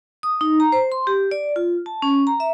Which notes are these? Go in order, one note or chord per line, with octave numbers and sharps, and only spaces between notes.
D#6
D#4
A#5
C5
C6
G4
D5
F4
A5
C#4
A#5
E5